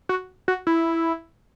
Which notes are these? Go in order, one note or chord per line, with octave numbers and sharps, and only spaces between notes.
F#4
F#4
E4